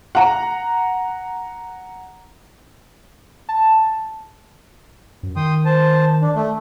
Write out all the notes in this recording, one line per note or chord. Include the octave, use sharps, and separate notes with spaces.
F#5 A#5
A5
F#2
D#3 G5 C6 D#6
C5 A5
D4
A3